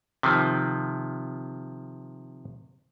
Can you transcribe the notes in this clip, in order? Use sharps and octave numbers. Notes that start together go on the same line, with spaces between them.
C3 D#3 F3